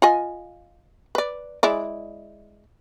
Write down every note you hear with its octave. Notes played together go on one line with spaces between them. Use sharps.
F4 D#5 G#5
B4 D5
G#3 E4 D5